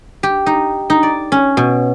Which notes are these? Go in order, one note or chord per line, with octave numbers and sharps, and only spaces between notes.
G4
D#4
D#4
D5
C#4
B2